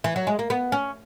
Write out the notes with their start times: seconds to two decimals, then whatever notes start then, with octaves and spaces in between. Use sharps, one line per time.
0.04 E3
0.16 F#3
0.27 G#3
0.39 A#3
0.50 B3
0.72 C#4